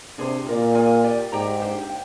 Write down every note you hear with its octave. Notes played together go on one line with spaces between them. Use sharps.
C3 D4 G#4 C5
A#2 F4 A#4 D5
F4 G#4 D5 G#5
G4 D5 G#5
G#2 G4 D5 G5 A#5
D4 G4 C5 G5
G5